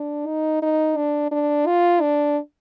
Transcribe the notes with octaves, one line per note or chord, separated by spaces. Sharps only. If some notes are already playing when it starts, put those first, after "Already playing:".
Already playing: D4
D#4
D#4
D4
D4
F4
D4